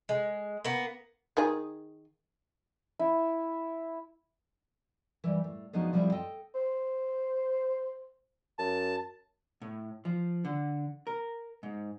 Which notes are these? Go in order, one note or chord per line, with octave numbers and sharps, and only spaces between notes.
G#3
A#3 B3
D#3 G#4
E4
E3 G3
A2
F3 G#3 B3 D4 D#4 F#4
F3 G3 C4 E4 F4 G#4
A4 D#5 G5
C5
F#2 A5
A2
F3
D3
A#4
G#2